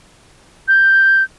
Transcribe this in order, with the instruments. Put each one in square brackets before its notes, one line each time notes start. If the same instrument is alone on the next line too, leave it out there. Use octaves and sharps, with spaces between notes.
[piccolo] G6